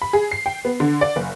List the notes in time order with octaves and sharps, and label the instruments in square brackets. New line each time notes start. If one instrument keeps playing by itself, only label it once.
[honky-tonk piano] B5
G#4
C7
G5
B3
D3
D5
F#1